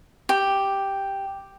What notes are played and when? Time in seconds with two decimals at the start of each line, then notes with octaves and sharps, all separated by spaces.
0.29 G4